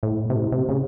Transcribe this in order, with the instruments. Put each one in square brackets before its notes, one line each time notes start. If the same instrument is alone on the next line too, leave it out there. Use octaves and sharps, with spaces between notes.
[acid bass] A2
C3
A2
C3
C#3